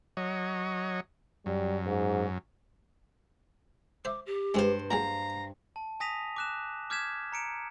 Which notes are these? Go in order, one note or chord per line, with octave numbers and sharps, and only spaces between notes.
F#3 C#5 D#5
F#2 G3
G#2
C5 E5 D6
G4
G2 G#3 C4 F4 C5
A#2 F#3 G#4 F5 A#5
A5
G#5 D#6 A#6 B6 D#7 F7
D6 F#6 E7
D6 F6 G6 G#6 B6 E7
A#5 C#7 D7 E7